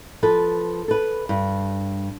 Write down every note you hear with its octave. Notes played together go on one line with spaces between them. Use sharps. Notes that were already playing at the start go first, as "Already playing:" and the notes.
F3 A4 B4
A4 B4
G2